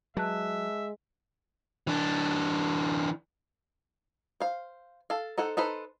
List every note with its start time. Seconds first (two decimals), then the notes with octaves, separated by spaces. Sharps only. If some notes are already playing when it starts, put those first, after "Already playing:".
0.17 F#3 G#3 B4 E5 A5 F#6
1.87 E3 D4
4.40 C5 F5
5.10 A4 F5
5.38 D#4 A4 C5 F#5
5.57 D#4 A4 B4 C5